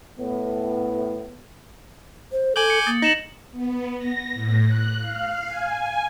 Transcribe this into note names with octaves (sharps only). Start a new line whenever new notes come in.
A2 B3
C5
A4 G#5 D6 G6 F#7
C#7 F#7
A#3 D#6 A6
D#4 A#6 E7 F#7
B3
A#6
A2
F#6
F5
G#5